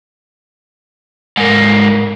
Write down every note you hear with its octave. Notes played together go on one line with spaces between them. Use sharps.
G#2 A#3